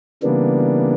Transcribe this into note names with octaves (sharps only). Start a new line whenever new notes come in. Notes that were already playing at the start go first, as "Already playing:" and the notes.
C#3 E3 G3 A#3 B3 D4